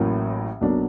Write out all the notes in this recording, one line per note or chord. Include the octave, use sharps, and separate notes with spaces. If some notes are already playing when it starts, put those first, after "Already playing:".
Already playing: A1 A2 F#3 A#3
B1 B2 F#3 A#3 D4